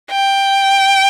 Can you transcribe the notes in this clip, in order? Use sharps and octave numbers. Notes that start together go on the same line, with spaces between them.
G5